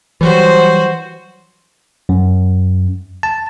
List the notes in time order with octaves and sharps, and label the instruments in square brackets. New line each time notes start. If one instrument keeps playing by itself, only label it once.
[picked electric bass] E3 F#3 G3 [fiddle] F#4 C5
[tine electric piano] F#2
A5